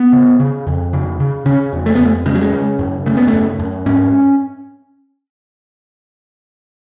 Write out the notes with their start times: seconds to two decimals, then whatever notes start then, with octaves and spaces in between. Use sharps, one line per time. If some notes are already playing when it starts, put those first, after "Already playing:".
Already playing: B3
0.13 C#3
0.40 C#3
0.67 F2
0.93 C#3
1.20 C#3
1.46 C#3 C#4
1.73 F2
1.86 A3
1.95 B3
2.00 F2
2.05 A3
2.26 C#3 G#3
2.34 F#3
2.41 G#3
2.52 C#3
2.79 F#2
3.06 C#3 A3
3.17 B3
3.27 A3
3.33 F#2
3.59 F#2
3.86 G#2 C#4